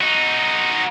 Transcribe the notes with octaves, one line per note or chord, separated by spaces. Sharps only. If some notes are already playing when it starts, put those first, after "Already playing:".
D#4 F#4